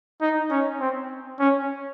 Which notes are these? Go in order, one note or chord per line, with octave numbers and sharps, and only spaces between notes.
D#4
C#4
C4
C#4